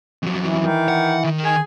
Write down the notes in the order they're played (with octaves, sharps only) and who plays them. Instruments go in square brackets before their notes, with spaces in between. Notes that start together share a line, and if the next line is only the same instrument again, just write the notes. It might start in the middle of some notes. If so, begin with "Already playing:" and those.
[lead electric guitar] F2 F#3
[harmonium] E3
[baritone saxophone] D#3
[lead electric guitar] F#5
D#3 A#4
[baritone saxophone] G#4